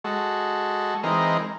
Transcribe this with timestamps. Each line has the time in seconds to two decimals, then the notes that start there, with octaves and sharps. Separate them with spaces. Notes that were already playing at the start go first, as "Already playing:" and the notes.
0.04 G#3 F#4 A4
1.03 E3 G#3 C4 D#4 A#4